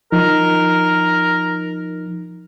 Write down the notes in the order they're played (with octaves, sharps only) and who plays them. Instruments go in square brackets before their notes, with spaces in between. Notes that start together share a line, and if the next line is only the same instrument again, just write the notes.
[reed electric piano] F3 D#4 [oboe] A#4